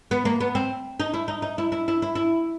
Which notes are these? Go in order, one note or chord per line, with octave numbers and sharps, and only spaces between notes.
B3
A#3
B3
C4
D#4
E4
D#4
D#4
E4
E4
E4
E4
E4